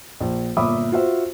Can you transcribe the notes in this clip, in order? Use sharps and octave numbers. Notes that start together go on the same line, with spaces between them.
A#1
G1 A#2 E5 B5 D6 D#6
F4 F#4 C5 E5